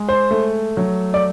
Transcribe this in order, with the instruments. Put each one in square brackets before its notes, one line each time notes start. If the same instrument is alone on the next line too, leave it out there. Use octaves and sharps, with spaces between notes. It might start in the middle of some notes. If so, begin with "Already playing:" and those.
Already playing: [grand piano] G#3
C5
A3
F#3
D5